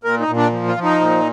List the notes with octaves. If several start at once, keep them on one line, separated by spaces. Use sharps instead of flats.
A#2 A#4
D#4
A#2
D4
F3
F4
F3
D#4
A#2